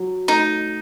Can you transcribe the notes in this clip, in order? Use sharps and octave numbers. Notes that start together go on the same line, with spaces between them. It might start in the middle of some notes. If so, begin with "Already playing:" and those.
Already playing: F#3
A3 D#4